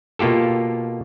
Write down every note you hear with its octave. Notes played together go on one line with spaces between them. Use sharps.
B2 A#3 F4 G4 A4